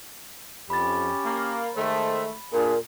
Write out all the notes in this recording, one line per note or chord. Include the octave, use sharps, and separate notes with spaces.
F2 C#4 G4 B5 A6
A#3
D#3 G#3 A3 A4 C5
A#2 D4 G#4 A#4